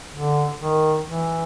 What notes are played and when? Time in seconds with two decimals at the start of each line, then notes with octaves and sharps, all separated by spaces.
0.14 D3
0.61 D#3
1.06 E3